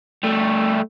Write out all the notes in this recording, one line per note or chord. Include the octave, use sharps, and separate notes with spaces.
G3 A3